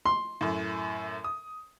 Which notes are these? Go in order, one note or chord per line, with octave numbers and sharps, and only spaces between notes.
C6
F#2 A2
D#6